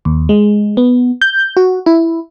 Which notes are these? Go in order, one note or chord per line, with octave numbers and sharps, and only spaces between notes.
D#2
G#3
B3
G6
F#4
E4